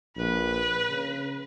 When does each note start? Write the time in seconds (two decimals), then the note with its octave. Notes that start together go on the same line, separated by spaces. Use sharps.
0.16 A#1 B4
0.89 C#3